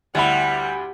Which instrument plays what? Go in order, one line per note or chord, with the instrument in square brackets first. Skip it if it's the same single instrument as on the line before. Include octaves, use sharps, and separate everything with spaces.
[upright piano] D2 E4 B5 [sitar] G3 [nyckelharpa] F#5